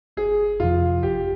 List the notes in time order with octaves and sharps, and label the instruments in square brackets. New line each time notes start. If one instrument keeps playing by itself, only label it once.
[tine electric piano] G1 [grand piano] G#4
[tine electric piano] F2 C3 F3 [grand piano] F4
[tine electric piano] G1 [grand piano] G4